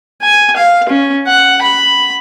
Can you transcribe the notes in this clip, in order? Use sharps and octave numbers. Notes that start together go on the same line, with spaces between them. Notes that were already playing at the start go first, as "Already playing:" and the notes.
G#5
F5
C#4
F#5
B5